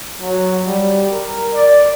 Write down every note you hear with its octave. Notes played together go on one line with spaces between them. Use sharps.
F#3
G3
A#4
D5